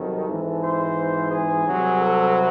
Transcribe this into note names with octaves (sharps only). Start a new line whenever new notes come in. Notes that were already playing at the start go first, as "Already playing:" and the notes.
Already playing: C2 C3 D#3 F#3 A4
G#1 G#2 E3
C5
G#4
C2 C3 F#3
A4